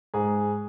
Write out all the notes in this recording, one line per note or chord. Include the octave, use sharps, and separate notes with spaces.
G#2 G#4